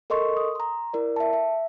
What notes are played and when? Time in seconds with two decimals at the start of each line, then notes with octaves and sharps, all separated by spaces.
0.10 A4 A#4 D#5 C6 C#6
0.37 D#6
0.55 A#5 C6
0.94 E4 A#4 D5
1.16 E5 A5
1.33 E5